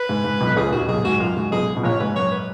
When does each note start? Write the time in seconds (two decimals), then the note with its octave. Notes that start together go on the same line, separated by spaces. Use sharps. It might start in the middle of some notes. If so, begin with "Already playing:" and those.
Already playing: B4
0.09 G#2
0.24 G#2
0.41 B1 B2
0.56 C#2 C#3 G#4
0.72 D#2 D#3 F#4
0.88 B1 B2 G#4
1.04 G#2 F#4
1.20 F#2 F4
1.36 G#2 F#4
1.52 B1 B2 G#4
1.77 B2
1.83 A#1 A#2 C#5
2.00 G#2 B4
2.16 F#2 C#5
2.31 B4